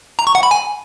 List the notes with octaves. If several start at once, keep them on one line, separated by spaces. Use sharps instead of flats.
A#5
C#6
F#5
B5
G#5